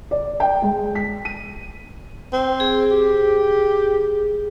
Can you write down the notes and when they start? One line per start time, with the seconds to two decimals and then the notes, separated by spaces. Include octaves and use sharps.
0.11 D5
0.40 G5
0.62 G#3
0.95 B6
1.25 D#7
2.33 C4
2.60 G#4
2.91 G4